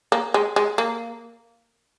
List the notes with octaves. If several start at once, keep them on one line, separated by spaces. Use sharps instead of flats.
A#3
G#3
G#3
A#3